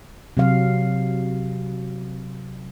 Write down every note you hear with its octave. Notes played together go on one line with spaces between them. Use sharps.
C3 F#3 F5